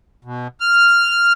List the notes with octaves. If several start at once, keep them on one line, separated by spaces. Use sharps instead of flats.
B2
F6